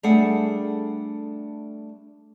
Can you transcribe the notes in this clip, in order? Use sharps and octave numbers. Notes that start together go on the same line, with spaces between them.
G3 A3 D4 G#4 A4 F#5